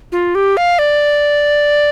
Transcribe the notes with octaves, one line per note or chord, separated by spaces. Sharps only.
F4
G4
F5
D5